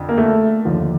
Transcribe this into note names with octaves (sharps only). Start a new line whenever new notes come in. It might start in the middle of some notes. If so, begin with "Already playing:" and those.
Already playing: F2 D3
A#3
A3
D#2 D3 F3